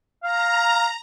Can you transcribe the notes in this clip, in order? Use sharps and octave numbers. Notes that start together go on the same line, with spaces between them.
F5 A#5